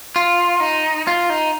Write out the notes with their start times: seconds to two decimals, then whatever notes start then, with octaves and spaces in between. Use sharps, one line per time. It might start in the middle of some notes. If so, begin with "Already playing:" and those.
0.16 F4
0.60 D#4
1.07 F4
1.30 D#4